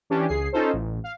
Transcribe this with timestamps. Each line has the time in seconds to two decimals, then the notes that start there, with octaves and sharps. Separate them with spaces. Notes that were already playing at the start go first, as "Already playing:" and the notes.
0.10 E3 C#4 D4 G4
0.28 C#2 G#4 C7
0.52 C#4 D#4 F4 A4 C5
0.73 A1
1.04 F5